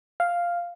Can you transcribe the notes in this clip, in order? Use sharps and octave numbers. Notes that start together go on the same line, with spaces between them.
F5